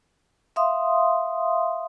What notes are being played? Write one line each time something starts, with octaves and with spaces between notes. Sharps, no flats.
E5 F5 C6 D#6